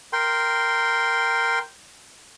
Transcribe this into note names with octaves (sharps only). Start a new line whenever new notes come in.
A#4 G5 C6